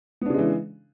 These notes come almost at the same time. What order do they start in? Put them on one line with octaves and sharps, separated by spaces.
B3 D4 C#3 G#3 E3